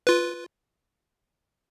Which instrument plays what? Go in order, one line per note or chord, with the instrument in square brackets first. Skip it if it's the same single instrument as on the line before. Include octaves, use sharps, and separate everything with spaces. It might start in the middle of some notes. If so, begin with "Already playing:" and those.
[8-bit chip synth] F4 B4